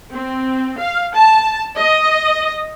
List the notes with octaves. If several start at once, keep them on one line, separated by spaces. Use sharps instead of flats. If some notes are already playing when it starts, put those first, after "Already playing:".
C4
F5
A5
D#5